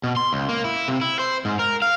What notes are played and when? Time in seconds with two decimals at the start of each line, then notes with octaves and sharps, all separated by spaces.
0.04 B2
0.17 C6
0.33 C#2
0.49 A#3
0.64 E4
0.88 C3
1.02 E4
1.19 C5
1.45 G#2
1.59 A#4
1.82 F5